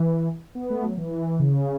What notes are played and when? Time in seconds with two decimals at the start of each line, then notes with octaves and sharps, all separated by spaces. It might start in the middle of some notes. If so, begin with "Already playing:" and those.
Already playing: E3
0.55 B3
0.70 A3
0.83 F#3
0.97 E3
1.39 C#3